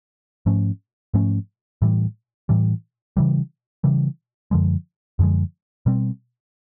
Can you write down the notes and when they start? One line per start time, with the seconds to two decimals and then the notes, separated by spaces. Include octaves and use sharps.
0.46 G#2 F3 A3 C#4
1.14 G#2 F3 A3 C#4
1.82 A2 E3 G3
2.49 A2 E3 G3
3.17 C#3 E3 G3
3.84 C#3 E3 G3
4.51 F#2 D3 F3 G#3
5.19 F#2 D3 F3 G#3
5.86 B2 G3 C4